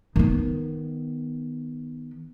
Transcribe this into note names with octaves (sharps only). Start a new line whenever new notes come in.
D#3 B3